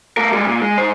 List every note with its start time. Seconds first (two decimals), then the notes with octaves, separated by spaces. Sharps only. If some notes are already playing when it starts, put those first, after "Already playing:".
0.17 A3 A#4
0.32 G3 G#3
0.47 A#2
0.61 G#3
0.78 G#2 C5